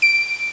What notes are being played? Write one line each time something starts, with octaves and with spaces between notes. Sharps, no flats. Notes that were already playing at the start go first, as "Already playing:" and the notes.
D7